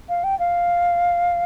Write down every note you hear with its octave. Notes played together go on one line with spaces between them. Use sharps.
F5
G5
F5